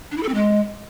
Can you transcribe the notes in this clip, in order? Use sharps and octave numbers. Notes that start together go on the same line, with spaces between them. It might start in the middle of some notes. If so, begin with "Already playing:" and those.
D4
E4
A4
C4
G#3